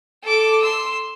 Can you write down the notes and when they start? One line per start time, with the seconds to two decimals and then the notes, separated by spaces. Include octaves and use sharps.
0.23 A4 D6
0.62 C6 E6